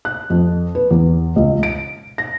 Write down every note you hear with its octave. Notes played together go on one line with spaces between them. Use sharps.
F#6
F2
B4
E2
C#2
D7
A#6